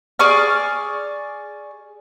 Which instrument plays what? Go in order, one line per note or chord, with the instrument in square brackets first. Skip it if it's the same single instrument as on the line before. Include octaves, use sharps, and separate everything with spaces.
[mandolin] G#4 D5 C#6 F6